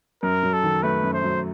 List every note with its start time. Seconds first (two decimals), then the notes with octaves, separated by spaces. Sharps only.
0.23 F#2 A#4
0.43 F#3
0.53 A4
0.63 D#3
0.83 A3 B4
1.03 F#2
1.13 C5
1.24 F#3